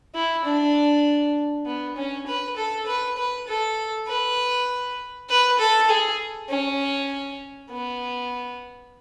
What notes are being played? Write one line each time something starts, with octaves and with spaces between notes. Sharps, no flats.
E4
D4
B3
C#4
B4
A4
B4
B4
A4
B4
B4
A4
G#4
C#4
B3